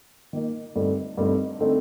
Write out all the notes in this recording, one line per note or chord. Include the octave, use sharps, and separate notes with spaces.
D#3 A#3 D#4
G2 D3 A3 C4 D#4
G2 D3 A3 C4 D#4
D3 A3 C4 D#4